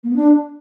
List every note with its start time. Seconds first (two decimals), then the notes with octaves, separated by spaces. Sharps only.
0.04 A#3
0.10 B3
0.16 D4